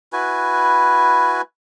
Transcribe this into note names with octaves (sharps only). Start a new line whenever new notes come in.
E4 F#4 B4 G#5